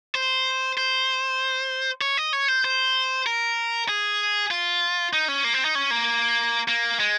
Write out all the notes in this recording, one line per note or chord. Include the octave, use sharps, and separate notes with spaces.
C5
C5
C#5
D#5
C#5
C5
C5
A#4
G#4
F4
D#4
C#4
A#3
C4
D#4
C#4
A#3
A#3
G#3